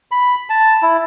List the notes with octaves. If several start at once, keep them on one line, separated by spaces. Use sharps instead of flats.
B5
A5
E4